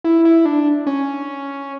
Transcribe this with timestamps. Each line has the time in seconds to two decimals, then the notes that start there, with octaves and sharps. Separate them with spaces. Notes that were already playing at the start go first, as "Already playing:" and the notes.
0.04 E4
0.25 E4
0.45 D4
0.86 C#4